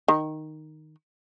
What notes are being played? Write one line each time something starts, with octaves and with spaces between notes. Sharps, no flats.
D#3